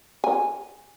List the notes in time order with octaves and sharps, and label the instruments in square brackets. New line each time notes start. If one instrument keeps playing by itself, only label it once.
[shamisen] G#5